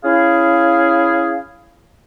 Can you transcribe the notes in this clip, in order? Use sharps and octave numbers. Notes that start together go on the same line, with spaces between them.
C#4 E4 G#4 F5